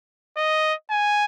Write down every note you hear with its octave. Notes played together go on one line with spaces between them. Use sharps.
D#5
G#5